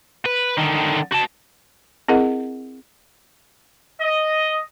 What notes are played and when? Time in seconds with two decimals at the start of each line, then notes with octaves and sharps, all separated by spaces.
0.25 B4
0.57 D3 D#3
1.12 F#4 A5
2.08 C4 E4 G#4 A#4 D#5 F#5
4.01 D#5